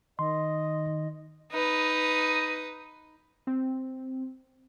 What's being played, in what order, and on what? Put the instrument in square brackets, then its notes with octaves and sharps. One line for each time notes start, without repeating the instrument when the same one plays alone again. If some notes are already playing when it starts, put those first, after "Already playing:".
[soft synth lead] D#3 [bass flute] D#5 [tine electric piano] C6
[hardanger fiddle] D#4 B4
[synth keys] C4